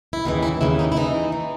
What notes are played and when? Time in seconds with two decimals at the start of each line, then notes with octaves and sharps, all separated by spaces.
0.13 E4
0.25 D#2 C#3 E3 D#4
0.43 E4
0.61 D#2 C#3 E3 E4
0.79 D#4
0.92 E4
0.97 G#2 E3 D#4
1.32 E3